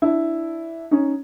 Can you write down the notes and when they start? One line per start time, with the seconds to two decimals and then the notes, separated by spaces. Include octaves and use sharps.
0.02 D4 E4
0.91 C#4 D#4